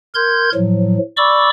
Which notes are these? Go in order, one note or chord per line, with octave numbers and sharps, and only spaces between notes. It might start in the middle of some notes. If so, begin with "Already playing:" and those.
A#4 C6 G6 G#6
A2 F3 F#3
D5 B5 C#6 D6 E6